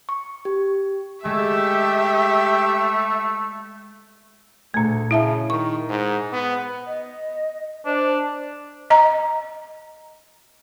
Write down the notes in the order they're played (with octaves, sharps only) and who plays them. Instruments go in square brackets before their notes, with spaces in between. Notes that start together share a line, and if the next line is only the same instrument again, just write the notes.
[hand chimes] C#6
G4
[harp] G#3 [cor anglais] A3 [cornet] G4 [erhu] E5
[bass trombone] D2 [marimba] A#2 A3
[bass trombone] C#3 [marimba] E4 E5 A5
[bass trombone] D#3 [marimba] C#6
[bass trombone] G#2
B3
[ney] D#5
[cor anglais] D4 [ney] C5
[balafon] D#5 A#5